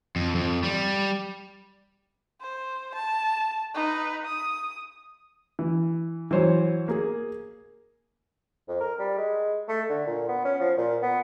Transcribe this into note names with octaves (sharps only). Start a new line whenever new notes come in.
F2
F2
G3
C5
A5
D#4 B4
D#6
E3
E3 F#3 C5 C#5
A#3 G#4
F2
A#4
G3
G#3
A3
D3
A#2
B3
C#4
F3
A#2
B3